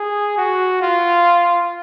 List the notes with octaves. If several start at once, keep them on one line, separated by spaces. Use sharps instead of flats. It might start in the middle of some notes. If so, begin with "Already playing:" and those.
Already playing: G#4
F#4
F4